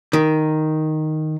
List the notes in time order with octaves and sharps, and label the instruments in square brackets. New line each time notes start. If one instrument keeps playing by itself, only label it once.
[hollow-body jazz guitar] D#3